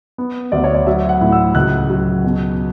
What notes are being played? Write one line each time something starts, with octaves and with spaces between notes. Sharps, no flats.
B3
D2 D5
C#5
D5
F#3 E5
F#5
A2
E6
C#2 F#6
F#3
B2